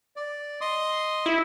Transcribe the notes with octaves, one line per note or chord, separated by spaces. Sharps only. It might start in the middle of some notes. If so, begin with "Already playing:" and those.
D5
D#5 C6 D#6
E4